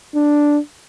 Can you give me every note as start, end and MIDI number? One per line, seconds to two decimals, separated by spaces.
0.15 0.59 62